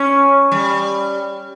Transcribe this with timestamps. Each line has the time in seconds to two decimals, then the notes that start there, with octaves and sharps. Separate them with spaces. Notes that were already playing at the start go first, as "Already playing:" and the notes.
Already playing: C#4
0.52 G3